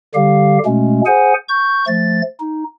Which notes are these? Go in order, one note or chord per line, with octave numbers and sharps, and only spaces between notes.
D3 G3 G4 F5
B2 G#3 A3 C#4
G#4 C5 F#5 G#5
C#6 G6
F3 A3 A6
D#4